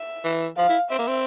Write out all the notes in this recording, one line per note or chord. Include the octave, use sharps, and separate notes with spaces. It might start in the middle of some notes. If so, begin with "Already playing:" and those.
Already playing: E5
E3
F3 F5
E4
C4 E5
A#3
C4